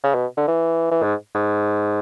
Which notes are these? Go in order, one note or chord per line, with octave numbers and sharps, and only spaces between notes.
C#3
B2
D3
E3
E3
G#2
G#2